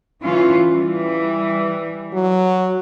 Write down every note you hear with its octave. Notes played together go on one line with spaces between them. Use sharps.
E3 C#4 F4
E3 G3
F#3